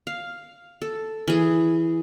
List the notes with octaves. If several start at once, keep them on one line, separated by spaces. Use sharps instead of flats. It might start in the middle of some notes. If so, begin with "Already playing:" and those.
F5
A4
E3 G#4